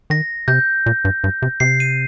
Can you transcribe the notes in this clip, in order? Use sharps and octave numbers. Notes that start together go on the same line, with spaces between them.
D#3 A#6
C3 G6
A#2
G2
G2
C3
C3 C7
D#7